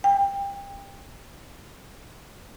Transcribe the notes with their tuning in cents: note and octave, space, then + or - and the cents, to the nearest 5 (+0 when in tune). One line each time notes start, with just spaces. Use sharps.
G5 +20